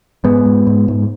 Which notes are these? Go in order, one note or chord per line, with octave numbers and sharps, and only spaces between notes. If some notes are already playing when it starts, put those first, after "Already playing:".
G#2 G#3 B3
G#2
G#2
G#2